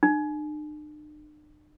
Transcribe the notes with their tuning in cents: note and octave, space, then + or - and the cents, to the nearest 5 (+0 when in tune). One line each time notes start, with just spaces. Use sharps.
D4 +45